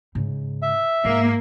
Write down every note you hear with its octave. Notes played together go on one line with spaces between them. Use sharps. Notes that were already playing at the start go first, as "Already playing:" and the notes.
G#2 C#3
E5
G#2 A#3